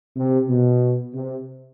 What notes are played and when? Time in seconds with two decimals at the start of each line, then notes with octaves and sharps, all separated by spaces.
0.16 C3
0.49 B2
1.14 C3